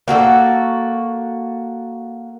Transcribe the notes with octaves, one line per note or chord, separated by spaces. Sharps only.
A#3 F#4 G4 A4